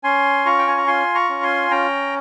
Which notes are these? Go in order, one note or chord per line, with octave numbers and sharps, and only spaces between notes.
C#4 G#5 C6
F4 A#5 C#6
G5
G#5
A#5
F4 G#5 C6
A#5 C#6
C#4
G#5 C6
C#4 G5 A#5